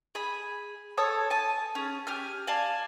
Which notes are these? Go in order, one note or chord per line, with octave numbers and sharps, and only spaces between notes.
G#4 G#5 B5
A4 C#5 D#6
G#5 A5
C#4 G#4
G4 G#5 F6
D5 F5 G#5 A5